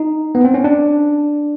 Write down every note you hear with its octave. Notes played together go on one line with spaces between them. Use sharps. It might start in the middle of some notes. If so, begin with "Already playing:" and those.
Already playing: D#4
B3
C4
C#4
D4